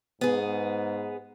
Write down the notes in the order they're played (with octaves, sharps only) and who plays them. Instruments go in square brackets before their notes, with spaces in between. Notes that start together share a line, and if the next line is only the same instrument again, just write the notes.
[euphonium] G#2 [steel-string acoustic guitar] B3 G#4